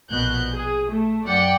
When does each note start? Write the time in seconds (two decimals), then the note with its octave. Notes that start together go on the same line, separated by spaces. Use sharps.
0.11 A#1 B2 F#6 G6
0.53 G#4
0.89 A3
1.25 F#2 D5 F#5 G5 C#7